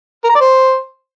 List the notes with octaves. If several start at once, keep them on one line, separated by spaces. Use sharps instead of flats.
A#4
A#5
D5
C5